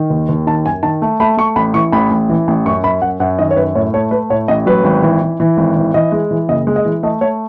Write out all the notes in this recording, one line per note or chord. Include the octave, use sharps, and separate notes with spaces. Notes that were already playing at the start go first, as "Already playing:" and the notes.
Already playing: D#3
D#2
D#2
D#3 A5
F#2 G#5
D#3 A5
A3
A3 B5
A3 C#6
A1 B5
E3 C#6
A1 B5
A1
E3
A1
F#2 C#6
F#2 B5
F#2 F#5
F#2 F#5
D#3 D#5
C#5
F#2 B4
A2 C#5
A3 C#5
A3 B4
A2 C#5
A1 D#5
F#3 B4
G#1
E3
E3
E3
G#1
E3
E3 D#5
G#3
E3
F#1 D#5
G#3
D#5
E3
A3 D#5
A3 C#5